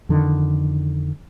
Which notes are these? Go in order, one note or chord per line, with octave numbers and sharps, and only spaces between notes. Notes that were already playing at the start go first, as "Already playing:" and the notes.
F2 D3 D#3